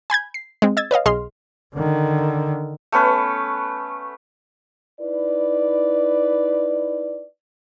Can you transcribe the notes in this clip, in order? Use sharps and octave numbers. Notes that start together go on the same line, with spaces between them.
G#5 B5 G6 G#6
C7
G#3 C4
D#5 E6 G#6 A6
B4 C#5 D#5 F5
B1 G#4 D#5 C6 F6
D3 D#3
A3 B3 C#4 B4
D#4 E4 B4 D5